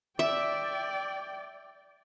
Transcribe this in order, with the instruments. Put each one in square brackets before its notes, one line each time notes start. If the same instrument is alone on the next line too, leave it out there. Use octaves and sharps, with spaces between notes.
[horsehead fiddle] D5 G5 [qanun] E5